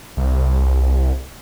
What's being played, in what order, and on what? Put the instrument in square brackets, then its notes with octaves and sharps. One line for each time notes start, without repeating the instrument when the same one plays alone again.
[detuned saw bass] C2